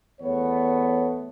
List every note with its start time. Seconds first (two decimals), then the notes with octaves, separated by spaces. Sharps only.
0.21 E2 A3 B3 C#5